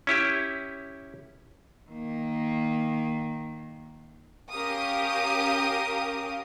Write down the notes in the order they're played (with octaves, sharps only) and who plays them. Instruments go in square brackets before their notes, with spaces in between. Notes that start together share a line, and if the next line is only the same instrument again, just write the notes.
[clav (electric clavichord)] C#4 E4 G4
[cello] D#3 A#3
[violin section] C#4 G4 A#4 F5 D#6